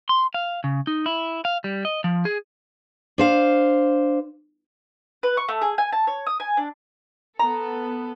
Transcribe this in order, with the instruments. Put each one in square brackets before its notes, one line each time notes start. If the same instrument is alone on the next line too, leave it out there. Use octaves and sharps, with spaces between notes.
[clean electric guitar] C6
F5
C#3
D#4
E4
F5
G3
D#5
F3
G#4
[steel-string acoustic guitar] D4 C5 F5
[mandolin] B4
C#6
A3
G#4
G#5
A5
C#5
D#6
G#5
D4
[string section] B3 A4 [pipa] A#5